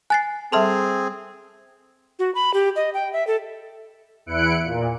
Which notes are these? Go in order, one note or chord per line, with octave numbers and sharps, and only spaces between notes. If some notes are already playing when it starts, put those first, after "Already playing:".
G#5 F#6 A6 C7
G3 C4 G#4 A4 E5 A5 C6 F6
F#4
B5
G4
D#5
G5
E5
A4
E2 E4 F#6 C#7 D7
A#2